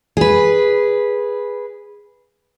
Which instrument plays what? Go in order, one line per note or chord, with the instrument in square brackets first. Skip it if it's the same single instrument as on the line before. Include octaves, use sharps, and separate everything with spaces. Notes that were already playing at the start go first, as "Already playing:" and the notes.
[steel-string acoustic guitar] G#4 B4